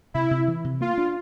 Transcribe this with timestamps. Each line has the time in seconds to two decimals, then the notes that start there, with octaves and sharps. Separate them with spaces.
0.14 C3 E4
0.31 C3
0.48 E3
0.64 C3
0.81 A#3 F4
0.98 D4